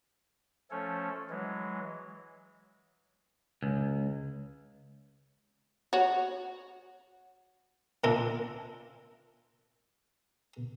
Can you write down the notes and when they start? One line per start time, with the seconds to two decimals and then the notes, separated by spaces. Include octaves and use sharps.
0.71 F3 A3 C#4 A4 C#5
1.30 E3 F#3 G#3
3.62 C#2
5.93 F#4 C#5
8.04 A#2 A#3 D4 E4 F4